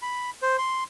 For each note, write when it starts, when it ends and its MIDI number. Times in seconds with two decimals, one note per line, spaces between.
0.02 0.30 83
0.42 0.57 72
0.58 0.84 84